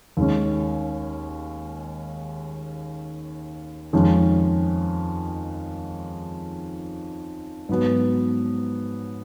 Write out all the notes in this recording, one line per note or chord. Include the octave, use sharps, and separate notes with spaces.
D#2 D#3 G#3 C#4
F2 D#3 G#3 C#4
G#2 F#3 B3